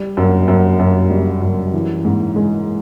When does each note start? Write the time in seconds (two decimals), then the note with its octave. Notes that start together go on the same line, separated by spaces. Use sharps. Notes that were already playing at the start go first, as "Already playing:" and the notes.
Already playing: G3
0.17 F#2
0.48 F#2
0.79 F#2
1.10 G3
1.42 F#2
1.74 E3
2.05 G#2
2.36 G#3